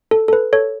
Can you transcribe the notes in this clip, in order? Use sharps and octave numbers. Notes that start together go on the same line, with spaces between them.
A4
A4
B4
A4 C#5